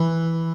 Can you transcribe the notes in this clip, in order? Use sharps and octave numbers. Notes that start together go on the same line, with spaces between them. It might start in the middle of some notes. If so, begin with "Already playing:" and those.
Already playing: E3